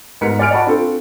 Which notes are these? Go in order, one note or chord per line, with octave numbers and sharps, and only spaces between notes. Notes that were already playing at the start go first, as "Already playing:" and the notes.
G#2 B3 A#4 B6 C#7
D5 G#5 F6 D7
D5 D#5 F#5 A5 B5 C#6
C4 D4 F4 A4